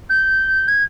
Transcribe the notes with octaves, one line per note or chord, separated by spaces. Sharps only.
G6
G#6